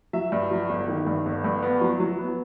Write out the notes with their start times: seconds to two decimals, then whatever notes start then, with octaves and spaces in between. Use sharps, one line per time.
0.13 F#3 E5
0.32 G2
0.51 F#3
0.69 G1
0.88 D#3
1.07 G2
1.26 G1
1.44 G2
1.63 B3
1.81 F#3
2.00 F#3
2.18 B3